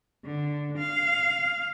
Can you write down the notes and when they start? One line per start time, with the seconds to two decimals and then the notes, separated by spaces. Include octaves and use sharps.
0.25 D3
0.78 F5